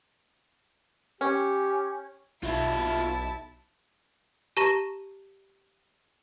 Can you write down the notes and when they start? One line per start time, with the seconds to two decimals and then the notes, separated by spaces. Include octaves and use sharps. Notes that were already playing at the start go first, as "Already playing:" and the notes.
1.21 C#4 G4
2.43 B1 E4 F4 E5 A5
4.57 G4 A5 A#5 C#6 A#6 E7